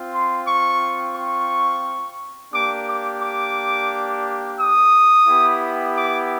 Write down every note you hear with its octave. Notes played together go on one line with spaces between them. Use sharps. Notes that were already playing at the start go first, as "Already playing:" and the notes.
Already playing: C4 F4
C6
C#6
C#6
A#3 D4 G4 D6
D6
D6
D#6
B3 E4 G4
D6